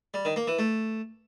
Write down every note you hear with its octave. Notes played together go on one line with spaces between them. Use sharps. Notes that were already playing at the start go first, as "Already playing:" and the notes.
G3
D#3
A#3
E3
A3